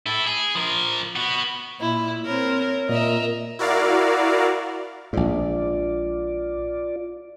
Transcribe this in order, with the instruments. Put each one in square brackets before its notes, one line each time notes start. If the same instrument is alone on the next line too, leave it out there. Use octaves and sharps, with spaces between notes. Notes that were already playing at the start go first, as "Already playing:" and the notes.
[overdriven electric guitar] E4 A4
G#4
F3 A#4
B3 F#4
[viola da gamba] A#2 [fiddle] E4
[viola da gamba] C4 A#4 [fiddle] C#5
[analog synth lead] A#2 [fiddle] A#4 E5 [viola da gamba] D#5
[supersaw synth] E4 F#4 A#4 D5 F5
[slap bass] A#1 G#2 [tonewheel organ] F4 D5